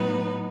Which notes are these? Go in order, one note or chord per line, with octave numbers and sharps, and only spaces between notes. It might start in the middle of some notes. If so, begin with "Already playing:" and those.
Already playing: A2 F#3 B3 D#4 B4